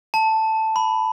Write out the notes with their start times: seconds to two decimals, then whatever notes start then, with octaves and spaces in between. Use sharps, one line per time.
0.14 A5
0.76 B5